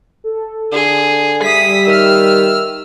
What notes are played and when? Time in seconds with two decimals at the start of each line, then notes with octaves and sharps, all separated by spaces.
0.24 A4
0.72 D3 G#4
1.43 G3 E5 D#6 B6
1.87 D#3 E6 F6